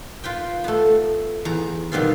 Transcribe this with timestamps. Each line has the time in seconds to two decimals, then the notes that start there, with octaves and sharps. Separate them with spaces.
0.24 F4 B4 G5
0.64 A3 B3
1.45 E2 A#5
1.92 B2 D#3 G3 B3 C4 F4